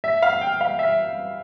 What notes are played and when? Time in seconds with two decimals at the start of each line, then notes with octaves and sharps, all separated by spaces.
0.04 E5
0.22 F5
0.41 G5
0.61 F5
0.79 E5